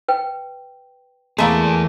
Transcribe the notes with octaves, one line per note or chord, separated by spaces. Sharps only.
B4 G5
E3 A3 A#3 G#4 F5 C6